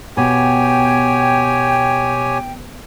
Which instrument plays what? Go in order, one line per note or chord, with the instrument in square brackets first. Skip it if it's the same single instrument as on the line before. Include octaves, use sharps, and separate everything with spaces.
[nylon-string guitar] B2 [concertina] G4 C#5 G#5 [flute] G5